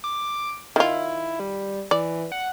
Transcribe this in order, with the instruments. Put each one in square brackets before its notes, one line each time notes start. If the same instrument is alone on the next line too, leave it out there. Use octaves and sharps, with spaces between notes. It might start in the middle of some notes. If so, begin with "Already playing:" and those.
[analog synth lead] D6
[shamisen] D#3 F4 [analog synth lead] E4
[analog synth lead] G3
[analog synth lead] E3 [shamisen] D5
[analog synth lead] F#5